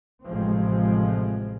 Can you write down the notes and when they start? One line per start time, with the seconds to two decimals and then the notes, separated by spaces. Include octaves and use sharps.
0.24 A1 A2 C3 F3 G#3 C4